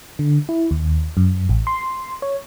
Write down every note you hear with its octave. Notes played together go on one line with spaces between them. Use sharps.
D3
E4
D#2
F#2
A1
C6
C#5